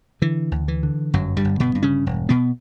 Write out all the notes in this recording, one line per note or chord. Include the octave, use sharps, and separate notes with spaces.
D3 E3
D2
E3
D3
G1 F#2 F#3
G2 G3
G1
B2 B3
G2
C#3 C#4
E1
B2 B3